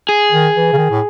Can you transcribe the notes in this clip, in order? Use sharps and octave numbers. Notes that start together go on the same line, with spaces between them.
G#4
D#3
E3
C#3
D#3
A2